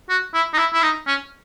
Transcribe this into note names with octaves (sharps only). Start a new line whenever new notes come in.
F#4
E4
D#4
E4
E4
D#4
C#4